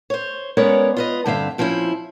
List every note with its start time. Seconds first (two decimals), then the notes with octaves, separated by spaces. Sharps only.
0.10 C5 C#5
0.57 G#3 B3 C#4 A#4 C#5 D5
0.97 F4 B4 D#5
1.26 G2 D3 C4 E5 F5
1.58 A#2 F3 C4 C#4 E4